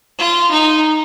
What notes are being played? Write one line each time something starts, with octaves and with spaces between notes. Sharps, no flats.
F4
D#4